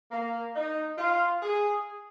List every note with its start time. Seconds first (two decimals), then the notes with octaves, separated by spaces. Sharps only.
0.12 A#3
0.55 D#4
0.98 F4
1.43 G#4